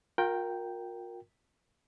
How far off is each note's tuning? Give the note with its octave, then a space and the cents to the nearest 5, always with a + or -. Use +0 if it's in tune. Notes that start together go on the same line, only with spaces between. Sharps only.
F4 +40 A#4 +0 G5 +0